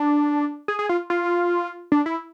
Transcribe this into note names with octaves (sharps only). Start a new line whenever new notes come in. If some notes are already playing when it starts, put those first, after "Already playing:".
Already playing: D4
G#4
G#4
F4
F4
D4
E4